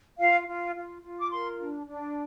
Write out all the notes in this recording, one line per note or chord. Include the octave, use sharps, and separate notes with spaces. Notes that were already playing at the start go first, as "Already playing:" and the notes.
F4 F5
F4
F4
F4
D6
A#4 C6
D4
D4